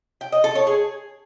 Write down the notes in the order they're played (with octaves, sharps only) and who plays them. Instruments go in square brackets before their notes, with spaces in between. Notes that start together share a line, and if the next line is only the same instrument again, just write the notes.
[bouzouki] G5
D#5
A4
C#5
G#4